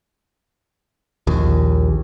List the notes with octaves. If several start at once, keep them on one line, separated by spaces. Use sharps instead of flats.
A#1 D#2